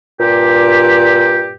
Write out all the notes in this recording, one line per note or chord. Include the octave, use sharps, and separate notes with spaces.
G2 A#2 G4